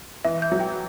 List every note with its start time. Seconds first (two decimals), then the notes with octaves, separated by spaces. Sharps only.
0.25 E3 E5
0.42 G6
0.52 F#3
0.60 G5